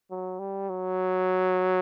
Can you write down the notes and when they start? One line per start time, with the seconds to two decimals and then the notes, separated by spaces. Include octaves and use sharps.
0.11 F#3
0.39 G3
0.69 F#3